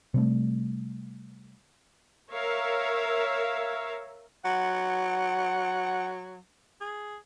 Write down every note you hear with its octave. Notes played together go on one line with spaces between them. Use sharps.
C3 G3 A3
A#4 C#5 E5 F5
F#3 F#5
G#4